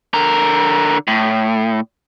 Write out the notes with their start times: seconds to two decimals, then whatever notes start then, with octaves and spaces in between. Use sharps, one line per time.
0.14 D3 A#4
1.08 A2